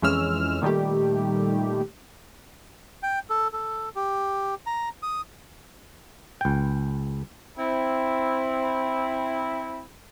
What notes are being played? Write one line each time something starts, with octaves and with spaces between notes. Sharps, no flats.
F2 E3 G#3 C#4 E6 F6
A#2 D#3 G3 A3 G4
G5
A4
A4
G4
A#5
D#6
C#2 G5
C4 E4